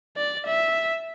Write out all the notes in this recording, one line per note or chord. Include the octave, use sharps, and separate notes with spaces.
D5
E5